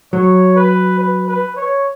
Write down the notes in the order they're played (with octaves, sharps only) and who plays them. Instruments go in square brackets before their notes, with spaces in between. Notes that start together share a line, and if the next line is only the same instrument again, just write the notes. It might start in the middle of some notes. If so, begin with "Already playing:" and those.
[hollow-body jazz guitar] F#3 [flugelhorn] C#5
[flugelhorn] B4
B4
B4
C#5